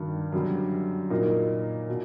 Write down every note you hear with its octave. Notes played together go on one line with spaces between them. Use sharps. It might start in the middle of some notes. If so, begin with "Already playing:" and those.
Already playing: G2 D#3 F#3
F#2 D3 G3
A#2 F#3 A#3 D#4
B2